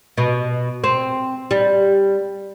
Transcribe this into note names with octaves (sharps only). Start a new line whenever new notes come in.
B2
C4
G3